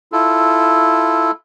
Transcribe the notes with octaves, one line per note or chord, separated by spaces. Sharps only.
E4 F4 A4